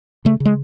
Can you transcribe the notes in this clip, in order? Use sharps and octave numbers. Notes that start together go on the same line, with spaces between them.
C#3 A3
C#3
G#3